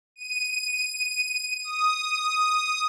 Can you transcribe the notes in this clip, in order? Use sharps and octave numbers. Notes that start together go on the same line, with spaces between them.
D#7
D#6